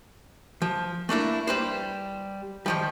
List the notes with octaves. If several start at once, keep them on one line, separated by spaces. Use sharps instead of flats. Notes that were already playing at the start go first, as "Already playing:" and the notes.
F3
A3 A#3 D4 E4
G3 B4 C5
D#3 F3 G3